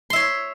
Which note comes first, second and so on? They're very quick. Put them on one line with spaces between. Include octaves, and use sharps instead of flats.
C6 E5 C#5